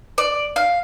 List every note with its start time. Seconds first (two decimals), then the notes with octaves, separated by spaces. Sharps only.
0.18 D5
0.56 F5